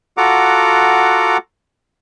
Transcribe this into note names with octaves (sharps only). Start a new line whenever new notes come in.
F4 F#4 A4 F#5 A#5 D6